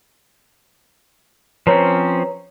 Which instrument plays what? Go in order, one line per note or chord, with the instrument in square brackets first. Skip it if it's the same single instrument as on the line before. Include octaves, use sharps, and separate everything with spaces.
[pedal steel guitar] F3 C4 C#4 [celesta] B4 C#5 A#5